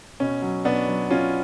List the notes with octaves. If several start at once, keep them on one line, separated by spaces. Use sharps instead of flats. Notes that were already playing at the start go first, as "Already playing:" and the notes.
B2 C#4
F#3
B2 B3 D4
F#3
B2 C#4 F4